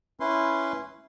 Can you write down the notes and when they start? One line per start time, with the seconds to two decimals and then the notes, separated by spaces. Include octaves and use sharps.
0.20 C#4 E4 B4 C6